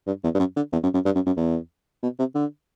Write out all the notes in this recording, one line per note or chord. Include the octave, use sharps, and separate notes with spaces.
G2
E2
G2
F#2
D3
E2
F#2
F#2
G2
F#2
F#2
E2
B2
C3
D3